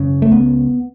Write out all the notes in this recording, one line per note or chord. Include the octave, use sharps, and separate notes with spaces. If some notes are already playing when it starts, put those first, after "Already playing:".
Already playing: F#2 C#3
A3
C#2 B3